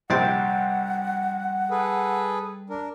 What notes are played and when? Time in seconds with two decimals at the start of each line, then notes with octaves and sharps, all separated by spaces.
0.10 A#1 C3 G3 C4 F#5 G5 A6
1.70 G#4 A4 B4
2.70 D4 A#4